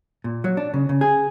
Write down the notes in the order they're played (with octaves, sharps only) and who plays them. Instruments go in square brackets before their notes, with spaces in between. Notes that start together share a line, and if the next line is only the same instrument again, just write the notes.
[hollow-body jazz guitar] A#2
F#3
D4
C#3
C#3
G#4